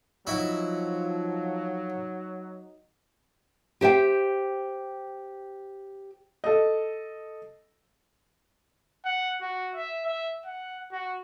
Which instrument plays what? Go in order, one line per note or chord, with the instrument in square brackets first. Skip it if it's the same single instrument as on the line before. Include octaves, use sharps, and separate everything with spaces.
[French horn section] F3 [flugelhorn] F#3 [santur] D#4 [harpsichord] E4 F#4 E5
[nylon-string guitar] G4 C5 E5 G5
[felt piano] A4 D#5
[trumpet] F#5
F#4
E5
E5
F#5
F#4